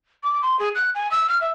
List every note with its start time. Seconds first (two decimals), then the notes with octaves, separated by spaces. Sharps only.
0.23 D6
0.42 C6
0.59 G#4
0.75 F#6
0.95 G#5
1.11 E6
1.29 F6
1.41 E5